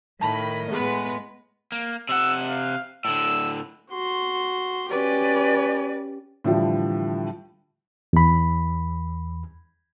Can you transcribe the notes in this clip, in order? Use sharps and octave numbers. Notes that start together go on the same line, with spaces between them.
A2 D#3 D#5 A5 B5
A2 G#3 B3 G#4 B4
A#3
C3 F#5 E6
F5
A2 D3 E6
F#4 C6
C#4 G4 B4 D5
A2 D3 E3 F3 G3
E2 B5